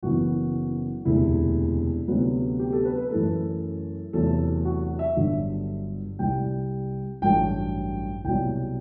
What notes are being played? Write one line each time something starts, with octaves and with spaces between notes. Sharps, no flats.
F#1 F#2 E3 B3 F#4
E1 D2 C3 E4
D2 C3 F#3 B3
G4
A4
B4
B4
F#2 E3 A3 A4
E2 C3 F#3 A3 A4
F#4
E5
G1 G2 D3 F#3
C2 C3 G3 G5
A1 G2 F#3 A3 G5
C2 B2 F#3 G5